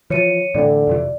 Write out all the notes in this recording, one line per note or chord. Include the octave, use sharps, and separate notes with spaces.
E3 F3 C#5 C#7 D#7
A2 D3 E3 C4 D5
F2 C3 E3